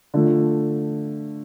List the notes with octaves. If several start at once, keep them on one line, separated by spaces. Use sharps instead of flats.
D3 F3 A3